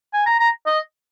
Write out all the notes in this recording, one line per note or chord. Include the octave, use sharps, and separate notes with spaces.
G#5
A#5
A#5
D#5